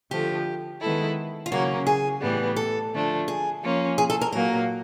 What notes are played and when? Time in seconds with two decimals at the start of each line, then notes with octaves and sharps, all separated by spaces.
0.11 D3 F3 A3 G4
0.82 D#3 G#3 B3 E4 A4
1.46 F4
1.51 C#3 F#3 A#3 C#4 F#4
1.87 G#4
2.22 A2 E3 G3 B3
2.56 A4
2.92 D3 F3 A3 D4
3.28 G#4
3.62 F3 A#3 C#4 F4
3.98 G#4
4.10 A4
4.21 A#4
4.33 A#2 F#3 A#3 A#4